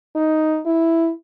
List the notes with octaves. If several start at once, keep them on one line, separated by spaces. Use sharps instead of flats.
D#4
E4